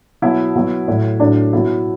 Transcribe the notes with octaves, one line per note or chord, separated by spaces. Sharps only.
B2 F#3 E4
B2 F#3
A2 F#3
A2 F#3 D4
B2 F#3 E4